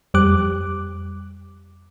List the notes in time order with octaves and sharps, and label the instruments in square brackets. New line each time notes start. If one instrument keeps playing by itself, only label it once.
[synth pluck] F2 G3 G4 D6 F#6